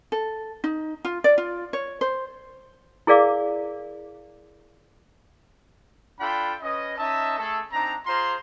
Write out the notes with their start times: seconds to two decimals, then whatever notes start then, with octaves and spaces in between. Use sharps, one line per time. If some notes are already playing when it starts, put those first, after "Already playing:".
0.12 A4
0.64 D#4
1.05 F4
1.24 D5
1.38 F4
1.73 C#5
2.01 C5
3.07 E4 G#4 A#4 D5 F5 D6
6.19 D4 F4 A4 G5 B5
6.62 C#4 B4 D#5
6.98 C#4 D#4 D#5 E5 A5
7.38 A3 G#4 A4
7.71 C4 D4 D#4 A#5
8.06 F4 G#4 C5 A#5 C6